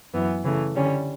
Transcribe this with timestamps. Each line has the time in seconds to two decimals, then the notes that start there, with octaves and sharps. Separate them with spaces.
0.14 F#2 E3 B3
0.44 C#3 E3 A3
0.75 D3 G3 C#4